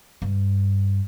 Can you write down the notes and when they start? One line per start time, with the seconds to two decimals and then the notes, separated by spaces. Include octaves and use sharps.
0.22 G2